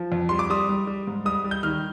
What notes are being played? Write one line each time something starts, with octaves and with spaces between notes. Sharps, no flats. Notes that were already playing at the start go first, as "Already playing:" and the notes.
Already playing: F3
F2
G3 C6
D6
G3 D#6
G3
G3
G#2
G3 D#6
G3
G6
D#3 F6